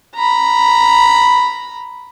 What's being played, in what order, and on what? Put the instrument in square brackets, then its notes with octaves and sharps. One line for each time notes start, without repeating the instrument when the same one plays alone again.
[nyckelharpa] A#5 B5